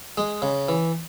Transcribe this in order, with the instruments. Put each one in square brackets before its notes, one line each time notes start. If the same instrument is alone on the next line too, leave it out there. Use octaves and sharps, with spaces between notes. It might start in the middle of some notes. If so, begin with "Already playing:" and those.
[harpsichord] G#3
C#3
E3